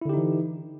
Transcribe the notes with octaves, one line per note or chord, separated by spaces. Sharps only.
D3 E3 D#4 E4 G4